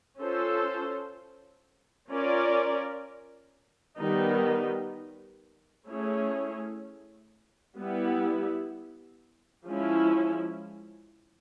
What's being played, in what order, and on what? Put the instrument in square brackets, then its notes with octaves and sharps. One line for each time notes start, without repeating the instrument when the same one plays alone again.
[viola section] C#4 F4 A4 C5
C#4 F4 A#4 D5
D#3 G3 B3 D#4
A3 C#4 E4 G#4 C#5
G3 B3 E4
F3 G#3 C#4 E4